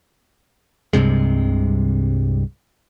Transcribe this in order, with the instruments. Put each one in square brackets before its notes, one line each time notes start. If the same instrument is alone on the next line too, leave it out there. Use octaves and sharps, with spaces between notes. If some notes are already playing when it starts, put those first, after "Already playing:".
[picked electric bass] C2 G2 C3 G#3